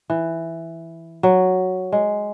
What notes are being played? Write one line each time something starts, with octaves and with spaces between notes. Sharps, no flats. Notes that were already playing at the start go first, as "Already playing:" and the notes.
E3
F#3
G#3